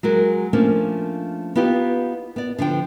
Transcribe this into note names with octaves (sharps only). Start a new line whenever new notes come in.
F#3 G#3 F#4 A#4
F3 A3 A#3 C#4 D4
B3 D#4 F4 G4 B4
B3 D5
D3 F3 D4 G5